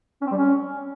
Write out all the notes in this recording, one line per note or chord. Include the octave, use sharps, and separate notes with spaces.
C#4
C4
G3
C#4